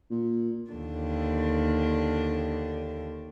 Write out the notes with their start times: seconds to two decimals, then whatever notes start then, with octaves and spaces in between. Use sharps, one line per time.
0.10 A#2
0.71 D#2 D3 D4